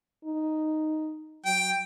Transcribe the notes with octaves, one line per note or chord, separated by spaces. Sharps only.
D#4
F#3 G5